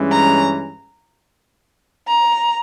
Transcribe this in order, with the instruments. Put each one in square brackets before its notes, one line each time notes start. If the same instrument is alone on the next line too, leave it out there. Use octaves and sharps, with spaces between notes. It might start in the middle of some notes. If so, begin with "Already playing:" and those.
Already playing: [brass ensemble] G2 E3 G#3 C#4
[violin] A#5
A#5